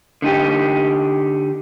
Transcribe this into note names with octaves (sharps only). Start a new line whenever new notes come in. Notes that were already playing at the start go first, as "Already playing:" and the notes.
D3 D#4 G4